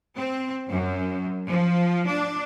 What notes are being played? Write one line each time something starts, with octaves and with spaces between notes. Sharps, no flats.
C4
F#2
F3
D4